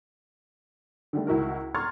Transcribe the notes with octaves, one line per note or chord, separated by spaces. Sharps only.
D3 D#3 G3 A3
C#2 E4 F#4 A#4
A#5 C6 C#6 F6 G#6 A6